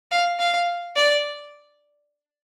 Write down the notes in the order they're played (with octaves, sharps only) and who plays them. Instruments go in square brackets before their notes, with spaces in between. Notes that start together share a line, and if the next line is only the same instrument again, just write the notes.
[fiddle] F5
F5
D5